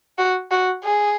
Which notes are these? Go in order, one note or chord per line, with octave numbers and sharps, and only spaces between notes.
F#4
F#4
G#4